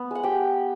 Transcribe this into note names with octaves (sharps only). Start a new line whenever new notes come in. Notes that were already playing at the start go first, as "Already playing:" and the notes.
Already playing: B3
G#3 F#5
G4 G5